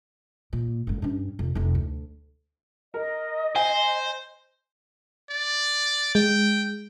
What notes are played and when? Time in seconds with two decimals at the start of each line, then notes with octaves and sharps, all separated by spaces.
0.53 A#2
0.87 F#1 G#2
1.02 G2 C#4
1.39 F1
1.55 F1 D#4
1.75 D2
2.94 A#4 D#5
3.56 C5 G#5
5.30 D5
6.15 G#3 G5